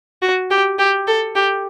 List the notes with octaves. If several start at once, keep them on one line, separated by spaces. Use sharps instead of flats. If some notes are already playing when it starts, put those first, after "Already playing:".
F#4
G4
G4
A4
G4